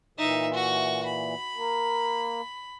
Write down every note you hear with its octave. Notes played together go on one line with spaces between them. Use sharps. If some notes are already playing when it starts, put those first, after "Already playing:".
A#2 E3 D#4 E5
F#4 C#6
B5
A#3